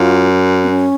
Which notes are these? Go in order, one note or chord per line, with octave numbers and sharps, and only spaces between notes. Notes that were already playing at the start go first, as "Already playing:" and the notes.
Already playing: F#2 F4
C4
C#4